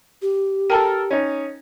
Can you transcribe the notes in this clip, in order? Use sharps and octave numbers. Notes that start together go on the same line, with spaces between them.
G4
A4 A#4 G5 A5 A#5
C#4 D#4